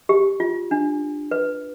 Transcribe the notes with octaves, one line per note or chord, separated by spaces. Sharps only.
G4
F4
D4
B4